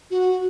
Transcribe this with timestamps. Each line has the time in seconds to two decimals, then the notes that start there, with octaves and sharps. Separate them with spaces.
0.11 F#4